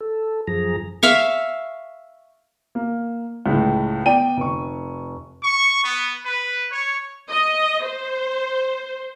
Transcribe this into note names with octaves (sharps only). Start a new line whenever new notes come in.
A4
F#2 F3 G#4 A#5
E5 F5 C#6
A#3
C#2 A2
B3 D5 G5 D#7
F1 C#6
C#6
B3
B4
C#5
D#5
C5